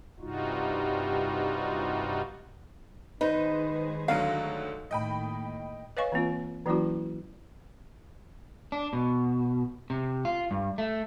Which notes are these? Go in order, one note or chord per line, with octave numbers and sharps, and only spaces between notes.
G2 C3 G3 D#4 F4 F#4
D#3 G#3 D#4 G#4 B4 C5
D2 D3 F#3 F5
A2 D#3 A#3 D#5 G5 B5
B4 C#5 D#5 F5 G#5 C#6
E3 A#3 C4 F4
E3 F#3 A#3 C#4 E4 F#4
D4
B2
C3
F4
G2
A3